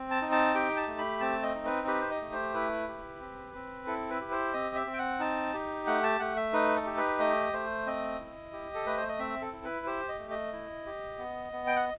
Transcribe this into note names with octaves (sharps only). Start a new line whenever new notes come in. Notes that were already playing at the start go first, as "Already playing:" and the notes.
Already playing: C4
A5
D#4
A5
G4 G5
A5
A3
B5
C4 A5
D#5
D#4
B4
G4 B4
C5
D#5
A3
C5
E4 B4
G4
C4
C4
E4 A4
B4
G4
C5
C4 D#5
E5
C4
G5
F#5
D#4 A5
G4
A3 F#5
A5
A3 F#5
E5
D#4 B4
A4
G4
B4
A3 D#5
A3 C5
C4 D#5
E4
G4
A4
A3 B4
C5
D#5
C4 E5
A4
E4
B4
G4 C5
D#5
A3
D#5
E4
G4
B3
B3
G5
F#5